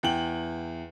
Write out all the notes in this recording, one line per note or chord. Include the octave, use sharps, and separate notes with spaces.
E2 G5 F#7